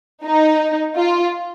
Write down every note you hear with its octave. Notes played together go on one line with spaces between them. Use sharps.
D#4
F4